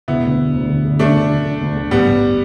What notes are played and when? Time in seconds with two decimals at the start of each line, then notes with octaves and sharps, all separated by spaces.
0.08 E1 B3 E4
0.23 D2
0.39 D2
0.54 D2
0.69 D3
0.85 D3
0.99 D2 A3 D4
1.15 D2
1.30 D3
1.45 D3
1.61 D2
1.76 D3
1.91 A1 G3 B3
2.06 A1